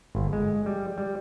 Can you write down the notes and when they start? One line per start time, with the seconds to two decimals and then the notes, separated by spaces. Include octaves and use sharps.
0.15 G1
0.33 G#3
0.66 G3
0.98 G3